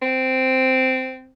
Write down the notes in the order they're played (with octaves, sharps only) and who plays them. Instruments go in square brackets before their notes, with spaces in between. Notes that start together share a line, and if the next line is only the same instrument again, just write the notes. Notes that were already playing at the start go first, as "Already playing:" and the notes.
[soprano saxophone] C4